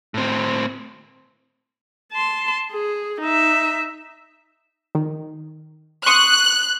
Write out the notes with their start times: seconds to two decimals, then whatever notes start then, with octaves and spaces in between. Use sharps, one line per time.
0.14 A2 C4
2.12 A5 C6
2.73 G#4
3.21 D#4 E5
4.95 D#3
6.06 C6 C#6 D#6 F#6